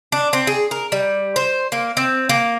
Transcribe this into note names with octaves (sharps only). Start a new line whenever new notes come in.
D4
C4
G#4
A#4
G3
C5
A#3
C4
A#3